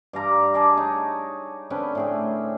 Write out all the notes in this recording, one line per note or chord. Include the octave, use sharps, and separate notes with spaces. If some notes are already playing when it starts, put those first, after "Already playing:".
G2 F5 A#5 D6
G#4 D5 D#5 A5
D#4 C#5
D3 C4 C#4 B4
A2 G#4 G5